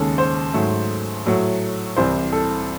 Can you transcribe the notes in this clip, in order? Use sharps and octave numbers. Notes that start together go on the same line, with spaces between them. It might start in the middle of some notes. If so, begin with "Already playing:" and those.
Already playing: D#2 C#3 G#3 A4
C5
G#2 F#3 A3
A2 F#3 A3
C2 C3 E3 C5
A4